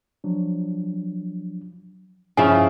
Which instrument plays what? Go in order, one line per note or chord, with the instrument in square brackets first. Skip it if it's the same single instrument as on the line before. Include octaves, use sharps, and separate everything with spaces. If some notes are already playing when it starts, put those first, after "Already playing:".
[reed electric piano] F3 F#3 D4
[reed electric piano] G2 C#6 [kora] C#3 F3 E4 [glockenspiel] G#5